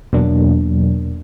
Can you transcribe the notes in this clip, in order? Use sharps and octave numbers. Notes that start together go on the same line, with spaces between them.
E2 B2 F#3 A#3 D4